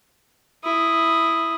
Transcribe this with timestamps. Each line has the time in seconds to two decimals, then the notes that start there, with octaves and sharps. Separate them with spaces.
0.64 E4 D#6